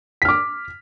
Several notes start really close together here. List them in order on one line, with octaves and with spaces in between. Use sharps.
B6 F6 D6